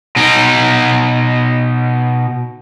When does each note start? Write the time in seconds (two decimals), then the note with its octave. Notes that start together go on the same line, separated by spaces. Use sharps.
0.16 B2 D#4